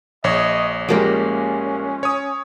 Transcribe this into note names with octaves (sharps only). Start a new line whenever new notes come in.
A#1 C#5 D#5
F3 G3 G#3 A#3 C#4 G4
C#5 D#6